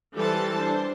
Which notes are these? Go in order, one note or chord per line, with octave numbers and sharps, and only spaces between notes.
E3 G3 G4 A4 C5 A5
D4 C5